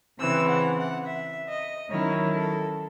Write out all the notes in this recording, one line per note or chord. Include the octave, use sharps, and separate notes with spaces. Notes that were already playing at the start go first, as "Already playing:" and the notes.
C#3 E3 C4 E6
F#5
F#5
E5
D#5
D#3 F#3 C#4 E4 C#5
A4